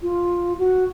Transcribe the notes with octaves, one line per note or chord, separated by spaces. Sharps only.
F4
F#4